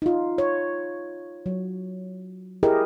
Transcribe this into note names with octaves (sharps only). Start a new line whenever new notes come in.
D#4 F4
C#5
F#3
E4 G4 G#4 A#4 D#5